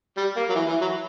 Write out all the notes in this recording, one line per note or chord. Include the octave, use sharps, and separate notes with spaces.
G3
A#3
F#3
E3
E3
F#3